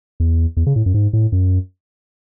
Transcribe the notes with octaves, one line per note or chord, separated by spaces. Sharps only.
E2
E2
C#3
A2
F#2
G#2
A2
F#2